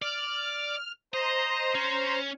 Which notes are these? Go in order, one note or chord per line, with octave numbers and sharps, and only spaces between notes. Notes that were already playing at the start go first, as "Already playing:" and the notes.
D5 F6
C5 D#5 A#5
C#4